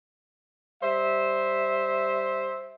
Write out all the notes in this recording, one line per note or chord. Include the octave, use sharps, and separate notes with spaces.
G3 C5 E5